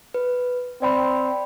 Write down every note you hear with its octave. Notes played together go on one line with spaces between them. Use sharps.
B4
C4 D5 G5 B5